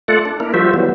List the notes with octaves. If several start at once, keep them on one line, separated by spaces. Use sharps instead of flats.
A3 F4 A4 D5 F#5
D4
A#3 D4 E4 A#4
F3 G3 F4 F#4 C5 E5
E3 F#3 G3 B3